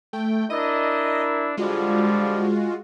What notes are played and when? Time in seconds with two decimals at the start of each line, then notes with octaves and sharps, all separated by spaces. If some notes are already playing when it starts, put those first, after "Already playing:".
0.13 A3 G5
0.50 D4 E4 A#4 D#5
1.57 D3 F3 G3 G#3 F4 F#4